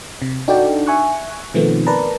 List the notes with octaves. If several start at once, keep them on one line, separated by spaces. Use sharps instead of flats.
C3
D4 D#4 F#4 A4 D5 G5
E5 G#5 C#6 F#6
B2 D#3 F3 A3 B3 C4
A#4 B4 D5 A5 A#5